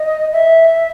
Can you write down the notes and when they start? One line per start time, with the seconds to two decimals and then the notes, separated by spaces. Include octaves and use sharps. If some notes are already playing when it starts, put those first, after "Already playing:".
Already playing: D#5
0.32 E5